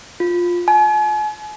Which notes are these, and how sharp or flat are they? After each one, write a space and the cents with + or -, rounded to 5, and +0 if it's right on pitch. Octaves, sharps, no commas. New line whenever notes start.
F4 +10
G#5 +40